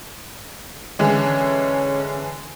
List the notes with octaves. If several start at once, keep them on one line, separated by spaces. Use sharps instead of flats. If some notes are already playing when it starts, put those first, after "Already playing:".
D3 E3 G#3 C#4